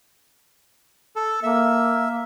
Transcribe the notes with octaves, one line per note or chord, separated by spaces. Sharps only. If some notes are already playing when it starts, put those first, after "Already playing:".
A4
A#3 E5